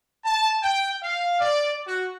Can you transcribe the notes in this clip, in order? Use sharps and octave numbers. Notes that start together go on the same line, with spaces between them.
A5
G5
F5
D5
F#4